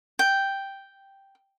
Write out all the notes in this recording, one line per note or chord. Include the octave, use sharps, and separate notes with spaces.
G5